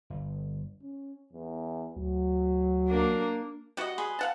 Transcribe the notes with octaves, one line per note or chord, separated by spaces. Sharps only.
G1
C#4
E2
D2 F#3
A#3 D4 A#4
G3 F#4 D#5 F#5
G#4 B4 C6
F5 F#5 A5